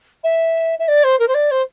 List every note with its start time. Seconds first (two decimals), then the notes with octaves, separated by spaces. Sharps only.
0.24 E5
0.79 E5
0.88 D5
1.04 C5
1.19 A#4
1.28 C5
1.34 D5
1.51 C5